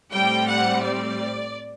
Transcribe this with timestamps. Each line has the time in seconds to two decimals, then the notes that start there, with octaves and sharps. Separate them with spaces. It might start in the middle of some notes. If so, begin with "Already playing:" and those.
0.13 A2 G3 C4 G5
0.48 F#5
0.83 D5